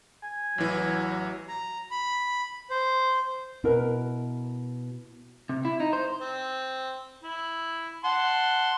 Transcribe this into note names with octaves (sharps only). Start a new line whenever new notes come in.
G#5
A1 E3 F#3
A#5
B5
C5
B2 E4 A#4 B4
C3
E4
D#4
C5
C4
E4
F#5 A5 C6